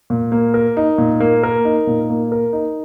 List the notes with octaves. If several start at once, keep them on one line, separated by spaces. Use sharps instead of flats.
A#2
A#3
A#4
D#4
A#2
A#3
A#4
D#4
A#2
A#3
A#4
D#4